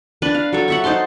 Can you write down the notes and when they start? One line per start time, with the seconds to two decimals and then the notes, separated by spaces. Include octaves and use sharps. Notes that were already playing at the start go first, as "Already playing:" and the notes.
0.22 D4 B4
0.35 F5
0.52 F#3 A4 C#5
0.68 C#5 E5 F#5
0.84 D#4 C5 A5 C6